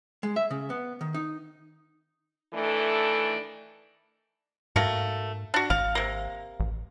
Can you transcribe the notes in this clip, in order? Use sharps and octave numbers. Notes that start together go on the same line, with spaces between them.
G#3
E5
C#3
B3
D#3
D#4
D#3 E3 A3 D4 A4
G#2 A3 A#3 F#4
D4 F#4
G#1 F5
C3 A#3
A1